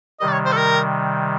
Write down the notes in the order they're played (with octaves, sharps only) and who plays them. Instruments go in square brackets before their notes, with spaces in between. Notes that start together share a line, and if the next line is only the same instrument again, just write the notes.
[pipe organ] C3 D#3 G3 [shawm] D#5
[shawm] D5
C#5
C5
A4
A#4